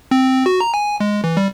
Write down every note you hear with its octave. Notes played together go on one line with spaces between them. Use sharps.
C4
F#4
A#5
G#5
G#3
E3
G3